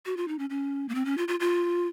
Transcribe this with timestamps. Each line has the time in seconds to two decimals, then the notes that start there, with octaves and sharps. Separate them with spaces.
0.06 F#4
0.17 F4
0.28 D#4
0.39 C#4
0.50 C#4
0.89 A#3
0.95 C4
1.05 C#4
1.18 F4
1.28 F4
1.40 F4